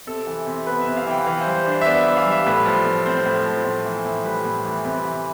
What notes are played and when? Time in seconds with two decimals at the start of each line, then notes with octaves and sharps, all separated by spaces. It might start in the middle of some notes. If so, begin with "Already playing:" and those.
0.07 C3 A4
0.27 E3
0.46 C3
0.66 B3 B4
0.82 E5
0.87 C3
0.97 F5
1.06 E3 G5
1.26 E3 F5
1.41 C5
1.47 G3
1.56 C5
1.66 D4
1.72 C5
1.81 E5
1.86 B3 D5
2.01 E5
2.06 E3
2.16 F5
2.26 G3
2.31 E5
2.46 A2 B4
2.66 F3
2.85 A2
3.06 C4 C5
3.25 A2
3.46 F3
3.65 A2
3.85 E3
4.05 A2
4.24 G3 B4
4.45 A2
4.65 E3
4.84 C3 B4
5.05 E3